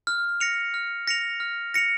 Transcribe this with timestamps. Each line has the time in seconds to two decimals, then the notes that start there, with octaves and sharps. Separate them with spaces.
0.07 F6
0.40 A#6 C#7 F7
0.74 F6
1.08 A#6 C#7 F7
1.40 F6
1.74 A#6 C#7 F7